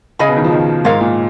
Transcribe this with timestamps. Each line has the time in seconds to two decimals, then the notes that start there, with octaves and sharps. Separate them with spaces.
0.19 C#3 G#4 D#5 G#5 B5
0.29 B2
0.37 D#3
0.44 F3
0.53 D#3
0.84 G#2 F4 A#4 C#5 F5
1.00 A#2